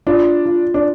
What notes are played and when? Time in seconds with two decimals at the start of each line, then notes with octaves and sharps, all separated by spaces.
0.06 D4 F4
0.46 F4
0.74 D4